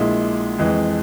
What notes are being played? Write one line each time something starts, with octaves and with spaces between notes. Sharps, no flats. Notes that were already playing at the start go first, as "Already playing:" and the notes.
Already playing: A#1 A#2 G#3 E4
F2 E3 G#3